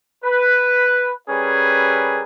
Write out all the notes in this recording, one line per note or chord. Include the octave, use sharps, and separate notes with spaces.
B4
G3 C#4 G#4 A#4 B4